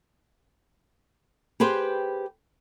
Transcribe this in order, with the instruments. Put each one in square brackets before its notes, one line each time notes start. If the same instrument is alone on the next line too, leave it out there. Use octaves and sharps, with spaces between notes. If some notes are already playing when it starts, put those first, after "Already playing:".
[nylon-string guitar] G4 G#4 B4 C5 G5